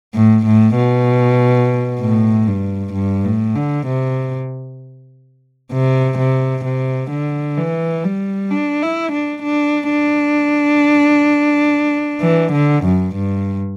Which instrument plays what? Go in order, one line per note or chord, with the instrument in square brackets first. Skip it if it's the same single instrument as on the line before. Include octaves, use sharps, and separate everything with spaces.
[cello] A2
A2
B2
A2
G2
G2
A2
D3
C3
C3
C3
C3
D3
E3
G3
D4
E4
D4
D4
D4
E3
D3
F#2
G2